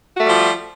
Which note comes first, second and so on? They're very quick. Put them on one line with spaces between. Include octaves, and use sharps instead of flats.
F#4 A3 G3 F3